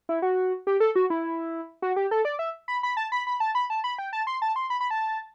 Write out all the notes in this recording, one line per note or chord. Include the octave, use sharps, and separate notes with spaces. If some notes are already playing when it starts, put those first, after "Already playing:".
E4
F#4
G4
A4
F#4
E4
F#4
G4
A4
D5
E5
B5
B5
A5
B5
B5
A5
B5
A5
B5
G5
A5
C6
A5
C6
B5
B5
A5